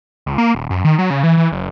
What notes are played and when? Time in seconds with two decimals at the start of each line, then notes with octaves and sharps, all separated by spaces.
0.26 C#2
0.38 A#3
0.55 D#1
0.70 F#2
0.84 D#3
0.98 F#3
1.10 C#3
1.23 E3
1.37 E3
1.52 F#1